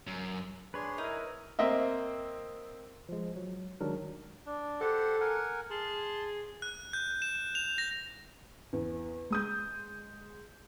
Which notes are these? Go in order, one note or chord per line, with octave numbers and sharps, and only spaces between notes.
F#2
D4 G#4 B4 C#5 C6
D#4 E4 A#4
A#3 C4 D#5 E5
F3 G#3
F#3
D#3 F#3 G#3 D4 A#4
D4
G4 A4 C5 F#5
A#4 F#5 G#5
G#4 A5 C6
F#6
G6
E7
F7
A#6
E2
G#3 D#6 G6